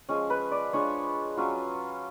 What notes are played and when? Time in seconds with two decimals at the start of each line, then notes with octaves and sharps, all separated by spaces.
0.09 F3 G#3 C#4
0.30 B4
0.52 D5
0.73 G#3 D4 F4 C#5
1.37 F#3 C#4 F4